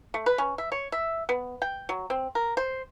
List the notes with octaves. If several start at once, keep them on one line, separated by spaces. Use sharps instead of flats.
A3
B4
C#4
E5
C#5
E5
B3
G5
F#3
C4
A#4
C5